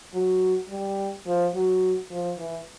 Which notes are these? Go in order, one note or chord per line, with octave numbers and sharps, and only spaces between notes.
F#3
G3
F3
F#3
F3
E3